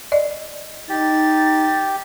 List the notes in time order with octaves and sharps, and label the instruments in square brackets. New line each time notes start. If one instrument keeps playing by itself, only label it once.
[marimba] D5 D#5
[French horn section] D#4 [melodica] G4 [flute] A6